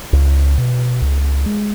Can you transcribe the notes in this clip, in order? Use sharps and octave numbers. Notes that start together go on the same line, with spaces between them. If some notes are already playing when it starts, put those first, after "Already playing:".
C#2
B2
C#2
G#3